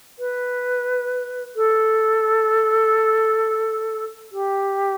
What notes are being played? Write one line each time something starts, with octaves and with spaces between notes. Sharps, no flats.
B4
A4
G4